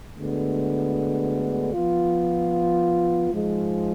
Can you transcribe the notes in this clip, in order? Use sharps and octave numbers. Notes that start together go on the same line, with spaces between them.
D2 D3 G#3 B3
F3 B3 F4
G#2 F3 G#3